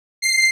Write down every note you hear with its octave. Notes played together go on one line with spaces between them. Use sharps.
C7